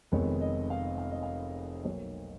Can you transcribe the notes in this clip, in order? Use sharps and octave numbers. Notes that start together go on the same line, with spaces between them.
F1 F2 D#3 G#3 B3 C#5
D#5
F5
F5
D#5
F5
B1 B2 A#3 C#5